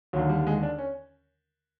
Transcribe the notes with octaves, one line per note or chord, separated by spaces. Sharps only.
D#2 D3 F#3
G3
G#3
D4
C#4